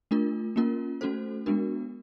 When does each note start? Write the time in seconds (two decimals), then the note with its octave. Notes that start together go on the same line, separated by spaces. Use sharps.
0.11 A3 D4 F4 A#4
0.56 A#3 C#4 F4 A#4
1.01 A3 C#4 F#4 A4 C5
1.46 G#3 B3 D4 F#4 A#4